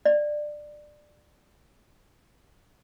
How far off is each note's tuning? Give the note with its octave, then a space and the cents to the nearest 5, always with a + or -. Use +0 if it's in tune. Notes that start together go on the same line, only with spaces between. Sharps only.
D5 +20